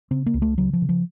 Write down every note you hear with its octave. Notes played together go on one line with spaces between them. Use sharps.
C#3 C4
A#3
C#2
A3
C#3 F#3
F3
C#3
F3